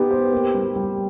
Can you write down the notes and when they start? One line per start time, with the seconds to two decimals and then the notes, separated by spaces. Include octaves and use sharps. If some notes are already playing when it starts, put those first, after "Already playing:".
Already playing: B3 D#4 G4
0.11 C5
0.33 A#3
0.54 G3
0.76 G3